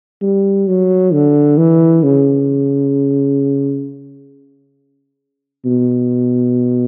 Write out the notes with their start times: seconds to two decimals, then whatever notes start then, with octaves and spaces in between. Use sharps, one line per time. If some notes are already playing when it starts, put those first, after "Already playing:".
0.21 G3
0.67 F#3
1.13 D3
1.58 E3
2.03 C#3
5.65 B2